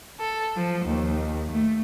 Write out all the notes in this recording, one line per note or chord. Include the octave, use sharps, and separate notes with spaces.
A4
F3
D#2
A3